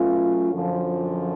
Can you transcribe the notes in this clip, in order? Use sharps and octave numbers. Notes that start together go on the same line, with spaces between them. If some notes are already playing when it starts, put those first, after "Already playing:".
Already playing: B2 F#3 A3 C#4 F4
F#2 D3 F3